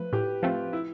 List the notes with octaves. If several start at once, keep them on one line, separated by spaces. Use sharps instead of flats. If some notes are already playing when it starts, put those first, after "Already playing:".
Already playing: F3 A3 B4
A2 G4
F3 A3 C4 F4
E4